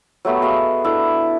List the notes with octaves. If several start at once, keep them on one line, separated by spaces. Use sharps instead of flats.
F#3 A3 B3 G4
F#4 G#4 D#5 F5
D4 E4 A4 D6